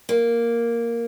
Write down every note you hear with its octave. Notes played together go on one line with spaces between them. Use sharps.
A#3